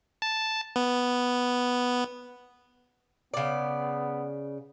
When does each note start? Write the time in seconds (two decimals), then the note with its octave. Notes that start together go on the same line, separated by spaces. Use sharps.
0.22 A5
0.76 B3
3.34 C#3 B3 D5